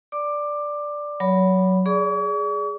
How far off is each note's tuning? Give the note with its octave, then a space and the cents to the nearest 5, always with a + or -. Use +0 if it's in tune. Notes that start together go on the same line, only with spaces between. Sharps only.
D5 +0 D6 +15
F#3 +0 C#5 +30 B5 +0
G#4 +0 D5 -15 C#6 +45